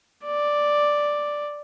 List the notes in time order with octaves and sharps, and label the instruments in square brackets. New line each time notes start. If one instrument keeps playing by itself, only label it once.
[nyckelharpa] D5